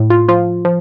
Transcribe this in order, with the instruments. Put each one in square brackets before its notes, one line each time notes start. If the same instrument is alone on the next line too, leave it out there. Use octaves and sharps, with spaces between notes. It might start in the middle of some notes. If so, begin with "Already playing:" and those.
Already playing: [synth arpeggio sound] A2
F4
F3 F4
F3